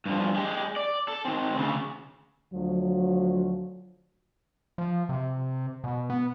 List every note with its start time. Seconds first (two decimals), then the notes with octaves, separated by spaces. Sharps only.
0.05 G2 F3
0.36 G#3 G4
0.76 D5
1.08 A4 A5
1.25 D#3 C4
1.57 D2 C#3
2.54 D2 F3 F#3
4.78 F3
5.09 C3
5.84 B2
6.10 B3